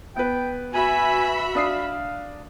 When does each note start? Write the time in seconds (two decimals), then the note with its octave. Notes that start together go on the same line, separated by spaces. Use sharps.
0.16 B3 B4 G5
0.74 F#4 E5 G#5 B5
1.55 D4 F5 D#6 C7